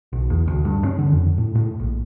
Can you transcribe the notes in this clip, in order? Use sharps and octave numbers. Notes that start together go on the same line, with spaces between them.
B1
E2
D2
G2
C#4
D3
F2
A2
A2
A#1